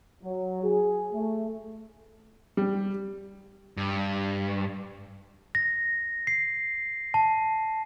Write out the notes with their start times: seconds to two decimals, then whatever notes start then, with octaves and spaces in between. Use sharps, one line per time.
0.23 F#3
0.63 G#4
1.13 A3
2.57 G3
3.77 G2
5.55 A#6
6.27 C7
7.14 A5